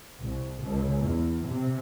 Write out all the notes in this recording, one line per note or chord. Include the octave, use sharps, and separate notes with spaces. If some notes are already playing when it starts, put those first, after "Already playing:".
C2
C#2
E2
C3